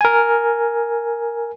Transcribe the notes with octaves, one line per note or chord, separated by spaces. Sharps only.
A#4 G#5